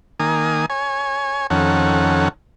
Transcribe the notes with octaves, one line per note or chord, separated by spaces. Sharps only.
D#3 A#3 G#5 D#6
C#5 G#5
F2 D#3 C#4 A4 F#5